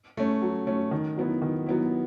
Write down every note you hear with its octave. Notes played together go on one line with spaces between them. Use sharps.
A3 C#4
F#3
A3 C#4
D#3
F#3 B3 E4
D#3
F#3 B3 E4